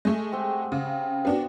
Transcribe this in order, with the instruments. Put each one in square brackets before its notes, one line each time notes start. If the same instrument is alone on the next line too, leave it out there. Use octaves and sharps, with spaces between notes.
[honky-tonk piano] G#3 A3
[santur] C4 G4 F#5
[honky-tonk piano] C#3
B3 D4 F#4